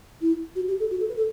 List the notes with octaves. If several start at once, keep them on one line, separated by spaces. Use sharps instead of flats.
E4
F#4
G4
A4
F#4
A4
B4
A4